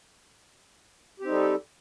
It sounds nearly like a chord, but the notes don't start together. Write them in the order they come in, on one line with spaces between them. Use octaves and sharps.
G4 C4 D#4 G3 A4